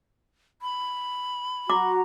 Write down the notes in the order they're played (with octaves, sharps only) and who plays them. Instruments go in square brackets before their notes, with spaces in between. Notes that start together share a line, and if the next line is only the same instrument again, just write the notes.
[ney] B5
[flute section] F#4 A#5 [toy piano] D6